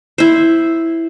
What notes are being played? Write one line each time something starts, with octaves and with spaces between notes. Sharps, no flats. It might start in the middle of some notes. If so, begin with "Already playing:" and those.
E4 C5